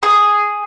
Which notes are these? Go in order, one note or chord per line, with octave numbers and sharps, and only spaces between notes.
G#4